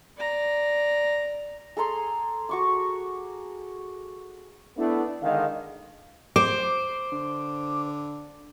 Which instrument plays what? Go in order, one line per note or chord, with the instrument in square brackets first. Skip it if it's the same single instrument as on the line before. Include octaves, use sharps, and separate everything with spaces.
[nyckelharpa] D5 A#5
[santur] G#4 A4 A#5 C6
F#4 C#6 D6
[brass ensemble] A3 B3 D4 E4
D3 D#3 G#3 D#5 F5
[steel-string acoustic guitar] C5 [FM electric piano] D6
[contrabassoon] D3